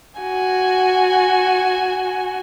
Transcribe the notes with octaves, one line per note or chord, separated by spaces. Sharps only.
F#4 G#5